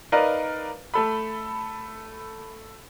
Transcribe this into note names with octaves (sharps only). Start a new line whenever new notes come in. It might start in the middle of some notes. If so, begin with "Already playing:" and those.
D#4 A#4 B4 D5 D#5 F5
A3 A4 B5